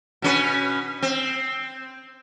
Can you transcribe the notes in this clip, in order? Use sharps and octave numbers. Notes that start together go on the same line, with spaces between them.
B2 C#4 B4
C4